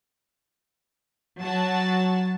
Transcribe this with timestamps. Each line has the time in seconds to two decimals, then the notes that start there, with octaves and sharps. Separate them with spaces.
1.41 F#3 F#4 A5